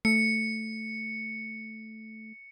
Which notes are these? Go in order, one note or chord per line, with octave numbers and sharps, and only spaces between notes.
A3 C#7